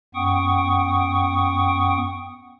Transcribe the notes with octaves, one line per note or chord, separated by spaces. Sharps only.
F#2 B3 F#5 G5 C#6 D#6